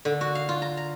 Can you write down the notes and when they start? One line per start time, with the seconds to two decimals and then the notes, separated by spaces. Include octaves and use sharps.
0.05 D3
0.21 F#4
0.35 F5
0.49 F4
0.62 A#5
0.77 A#5